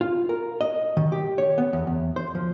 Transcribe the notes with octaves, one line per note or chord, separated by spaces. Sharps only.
F4
A#4
D#5
D#3
G4
C#5
B3
E2
E2
C5
F3